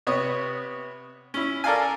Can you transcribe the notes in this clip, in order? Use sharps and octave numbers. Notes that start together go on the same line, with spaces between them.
C3 B3 C#5 D#6
C#4 E4
A4 A#4 D5 F5 G#5